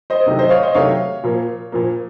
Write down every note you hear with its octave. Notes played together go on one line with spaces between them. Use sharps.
C5 D#5
C3 D#3 F#3 A3
C5 D#5
C#5 F5
C5 D#5
C3 D#3 F#3 A3 C#5 F5
A#2 F3 A#3
A#2 F3 A#3